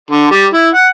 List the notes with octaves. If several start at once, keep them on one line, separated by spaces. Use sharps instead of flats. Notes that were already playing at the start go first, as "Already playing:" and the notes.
D3
G3
E4
F#5